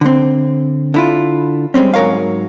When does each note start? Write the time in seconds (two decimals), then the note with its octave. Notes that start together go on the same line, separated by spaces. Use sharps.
0.01 D3 C4
0.94 D3 E4 F4
1.74 G3 G#3 A#3 C4 C#4
1.94 G#2 F#3 A#4 C#5 F5